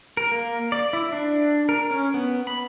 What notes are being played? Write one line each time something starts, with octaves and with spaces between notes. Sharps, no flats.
A#4
A#3
D5
E4
D4
A#4
C#4
B3
B5